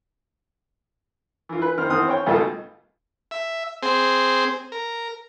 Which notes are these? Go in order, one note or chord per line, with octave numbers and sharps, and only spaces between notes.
E3 F4
B4
D#3 C4 F6
E2 C4 D#6 F6
C#5 G5
C#2 G2 B2 A3 D#4 F4
E5
C4 G#4 C5
A#4